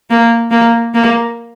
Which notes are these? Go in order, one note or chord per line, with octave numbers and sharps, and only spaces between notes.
A#3
A#3
A#3